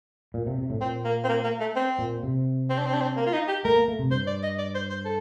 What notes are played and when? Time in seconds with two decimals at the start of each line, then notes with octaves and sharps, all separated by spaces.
0.34 A#2
0.47 C3
0.58 C3
0.70 A2
0.81 A#2 C4
1.05 A#3
1.24 C4
1.29 A#3
1.44 A#3
1.60 A3
1.76 C4
1.99 A#2
2.23 C3
2.70 C4
2.78 D4
2.86 C4
2.94 D4
3.02 C4
3.17 A#3
3.26 F4
3.33 D#4
3.48 G4
3.65 A3 A#4
3.76 A#3
3.88 A3
3.99 C3
4.11 G2 C5
4.27 D5
4.43 D#5
4.58 D5
4.75 C5
4.90 C5
5.05 A4